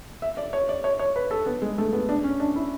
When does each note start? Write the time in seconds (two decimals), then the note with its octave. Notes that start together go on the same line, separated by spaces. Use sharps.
0.22 E5
0.37 D5
0.53 C#5
0.69 D5
0.84 C#5
0.99 C#5
1.16 B4
1.31 A4
1.46 B3
1.62 G#3
1.78 A3
1.93 B3
2.09 D4
2.24 C#4
2.40 D4
2.55 E4